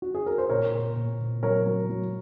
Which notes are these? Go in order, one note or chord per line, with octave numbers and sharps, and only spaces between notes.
F#4
G#4
A#4
C5
A#2 A#4 C#5
A#2
A#2
A#2
F#3 A#4 C#5
F#3
F#3